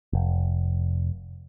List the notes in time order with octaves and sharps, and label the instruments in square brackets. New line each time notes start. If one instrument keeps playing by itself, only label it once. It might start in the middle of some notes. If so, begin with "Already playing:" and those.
[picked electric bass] F1